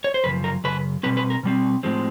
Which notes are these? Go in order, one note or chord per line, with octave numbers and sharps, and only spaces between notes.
C#5
C5
F#2 C#3 F3 B4
A#4
F#2 C#3 B4
B2 G3 C4 B4
B4
A#4
B2 G3 C4
A2 F3 G#3 C4